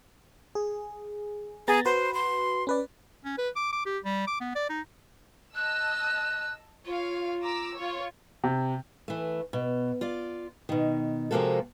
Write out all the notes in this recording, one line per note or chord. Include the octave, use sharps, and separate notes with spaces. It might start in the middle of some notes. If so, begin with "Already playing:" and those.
G#4
B3 G#4 A#5 A6
F#4 B4 C5
C6
C#4 B4 D5
C#4
B4
D6
D6
G4
G3
D6
B3
D5
D#4
D#5 A5 E6 F#6
F4 C#5 F5
A#5 D6 E6
F4 C#5
C3
E3 A3
B2
F4 D5
B2 D#3
C3 F3 G#3 A#3 F#4 A4